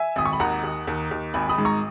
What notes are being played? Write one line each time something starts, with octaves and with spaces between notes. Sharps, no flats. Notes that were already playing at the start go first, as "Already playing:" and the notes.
Already playing: E5 G#5
G#1 D#6
C#6
B5
D#2 F#5 A#5
D#2
D#2
D#2
G#1 G#5 B5
B5 D#6
G#2
A#5 C#6